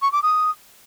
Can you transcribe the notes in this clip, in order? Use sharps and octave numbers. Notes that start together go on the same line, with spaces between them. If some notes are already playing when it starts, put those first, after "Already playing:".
C#6
D6
D#6